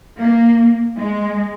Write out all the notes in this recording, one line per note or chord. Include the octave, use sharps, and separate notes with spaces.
A#3
G#3